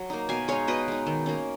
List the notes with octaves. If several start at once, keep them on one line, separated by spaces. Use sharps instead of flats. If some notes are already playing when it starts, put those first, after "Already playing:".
Already playing: F#3
A#3 D#4
B2 F5 G#5
G#3 D#4 C#5 F5
B2 B4 D#5
G#3 D#4
D#3
A#3 C#4